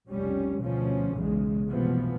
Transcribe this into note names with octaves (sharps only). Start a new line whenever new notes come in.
F1 B1 G3 C#4
D2 B2 F3 C#4
B1 E2 C#3 G#3
F1 C2 B2 E3 F3 B3